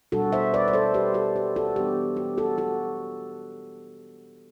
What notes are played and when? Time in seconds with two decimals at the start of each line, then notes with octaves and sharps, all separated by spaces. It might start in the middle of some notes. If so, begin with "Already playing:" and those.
0.12 B2 G3 D4 F#4 A4
0.32 C5 E5
0.54 B4 D5
0.68 D5
0.73 A4 C5
0.94 G4 B4
1.14 F#4 A4
1.36 G4
1.56 F#4 A4
1.76 E3 G3 B3 D4 G4
2.17 G4
2.38 F#4 A4
2.58 F#4 A4